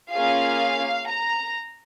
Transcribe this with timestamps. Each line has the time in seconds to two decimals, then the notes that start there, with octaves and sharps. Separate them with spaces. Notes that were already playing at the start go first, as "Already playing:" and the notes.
0.12 A#3 C#4 F4 G#4 F5
1.12 A#5